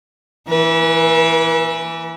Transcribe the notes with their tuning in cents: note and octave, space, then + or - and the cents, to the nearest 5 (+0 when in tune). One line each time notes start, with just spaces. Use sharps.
E3 +5 B4 -40